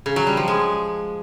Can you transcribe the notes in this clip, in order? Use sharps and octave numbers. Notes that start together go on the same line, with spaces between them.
C#3
F#3
G3
F3
G#3